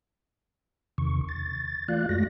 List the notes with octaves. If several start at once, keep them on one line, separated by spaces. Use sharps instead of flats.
E2 C3 D#3 C#6
A6
E3 A3 F4 D5 F5 F#6
F#2 G#3 A3 F#4 A#6